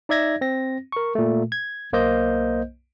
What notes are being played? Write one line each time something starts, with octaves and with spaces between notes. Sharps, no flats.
D#4 D5 E5 G#6 A#6
C4 A#6
A#4 C#6
A#2 A3
G#6
B1 A#3 C5 D#5 G6